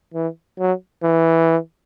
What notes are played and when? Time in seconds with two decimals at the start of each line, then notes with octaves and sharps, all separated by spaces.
0.14 E3
0.59 F#3
1.03 E3